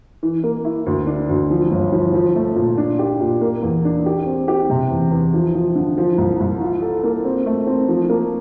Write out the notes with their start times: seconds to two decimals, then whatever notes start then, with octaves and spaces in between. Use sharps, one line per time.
0.23 E3
0.44 A#3
0.65 E4
0.86 D2
1.07 D4
1.29 D2
1.50 F3
1.71 G1
1.92 F3
2.14 F3
2.35 A3
2.56 A#2
2.78 D4
2.99 G4
3.20 A#2
3.41 A#3
3.62 E2
3.85 D4
4.06 G4
4.26 C4
4.48 G4
4.70 C3
4.91 E2
5.11 E2
5.34 F3
5.55 F3
5.75 D3
5.98 F3
6.18 C2
6.40 C2
6.60 F4
6.82 A4
7.04 A#3
7.25 C4
7.46 A3
7.67 C4
7.89 F3
8.09 A#3